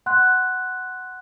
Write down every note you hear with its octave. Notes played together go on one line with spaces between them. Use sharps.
F#5 C6 F#6